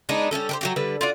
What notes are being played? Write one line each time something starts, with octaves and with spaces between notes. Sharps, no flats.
G#3 B3 D4 D#4
G3 A3 C#4 A4
G4 A#4 C5
F#3 F#4 G4
D3 G3 B4
F4 F#4 D5